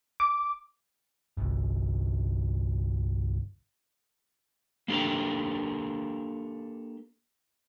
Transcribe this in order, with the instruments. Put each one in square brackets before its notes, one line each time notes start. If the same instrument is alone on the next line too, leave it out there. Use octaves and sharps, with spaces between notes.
[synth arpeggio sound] D6
[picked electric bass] G1 C2
[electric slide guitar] A#3 D4 G4 A4 A#4